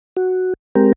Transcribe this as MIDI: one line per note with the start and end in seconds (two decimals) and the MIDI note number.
0.17 0.54 66
0.75 0.93 56
0.75 0.93 60
0.75 0.93 67
0.75 0.93 70